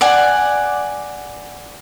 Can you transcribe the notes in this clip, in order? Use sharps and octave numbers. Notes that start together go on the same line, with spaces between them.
D5 F#5 G#5